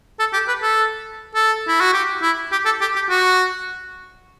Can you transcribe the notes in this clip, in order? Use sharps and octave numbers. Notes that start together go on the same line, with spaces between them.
A4
G4
B4
A4
A4
E4
F#4
G4
E4
G4
A4
G4
G4
F#4